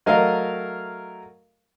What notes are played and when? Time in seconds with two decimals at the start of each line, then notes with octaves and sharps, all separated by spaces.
0.06 F#3 A3 A#4 D#5 F5